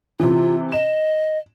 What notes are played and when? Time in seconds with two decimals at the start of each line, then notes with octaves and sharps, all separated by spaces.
0.20 C3 E3 F4
0.72 D#5 E7